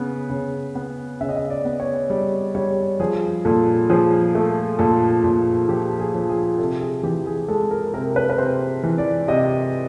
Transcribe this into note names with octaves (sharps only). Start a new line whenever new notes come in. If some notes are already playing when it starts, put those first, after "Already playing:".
Already playing: C#3 B3
C#3
B3
C#3 E5
D#5
E5
D5
B3
C#5
G3 D5
G3 C#5
F3 G#4
A#2 A4
F3 G#4
A3
A#2 A4
A#2
F3 G4
G#4
F3
G#4
C3 A4
G#4
E3 G4
G#4
G#3 A4
A#4
C3 A#4
B4
B4
C3 C5
E3
D5
C3 D#5